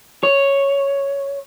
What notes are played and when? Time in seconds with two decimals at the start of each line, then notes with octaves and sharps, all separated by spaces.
0.23 C#5